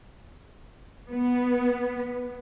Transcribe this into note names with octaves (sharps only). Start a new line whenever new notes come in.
B3